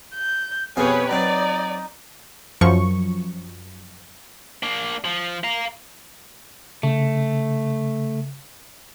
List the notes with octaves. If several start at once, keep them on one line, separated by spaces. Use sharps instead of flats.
G6
F2 B2 G4 G#4 B4 C#5 F5
F#3 C4 D#4 D5
F#2 F3 C#6
A#3 D4
F3
F5 A#5
C#3 A3